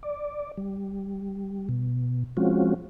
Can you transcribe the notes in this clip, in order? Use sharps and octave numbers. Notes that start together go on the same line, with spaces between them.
D5
G3
B2
F3 G#3 C4 C#4 F4 F#4